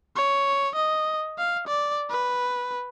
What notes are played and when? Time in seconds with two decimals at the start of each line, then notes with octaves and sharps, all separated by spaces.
0.16 C#5
0.75 D#5
1.38 F5
1.67 D5
2.10 B4